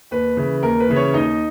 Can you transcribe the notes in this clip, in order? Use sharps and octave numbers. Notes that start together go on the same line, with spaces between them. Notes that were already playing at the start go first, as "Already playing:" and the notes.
D#2 B4
C#3 E3
D#2 A#4
B4
C#3 E3
C#4 C#5
D#2 D#4 D#5